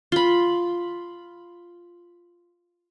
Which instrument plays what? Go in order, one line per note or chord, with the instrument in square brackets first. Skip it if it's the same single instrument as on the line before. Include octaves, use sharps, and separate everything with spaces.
[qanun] F4 B5